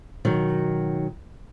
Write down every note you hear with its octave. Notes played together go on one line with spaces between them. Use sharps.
B2 D#3 F#3